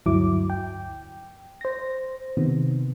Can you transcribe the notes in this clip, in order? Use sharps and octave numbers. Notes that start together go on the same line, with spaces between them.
D2 G2 F#3 E4 D6
G5
C5 A#6
C3 D#3 B3